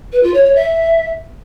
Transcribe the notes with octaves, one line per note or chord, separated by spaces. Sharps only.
B4
F4
C#5
C#5
E5